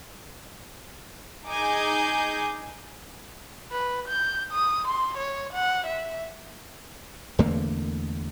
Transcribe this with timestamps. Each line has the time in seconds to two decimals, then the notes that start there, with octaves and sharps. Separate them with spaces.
1.47 D#4 G#4 D#5 G#5 D6 G6
3.71 B4
4.08 G6
4.52 D#6
4.88 C6
5.17 C#5
5.53 F#5
5.87 E5
7.39 E2 D3 A3 A#3